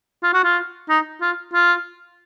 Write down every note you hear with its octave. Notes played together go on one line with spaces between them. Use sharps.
F4
F#4
F4
D#4
F4
F4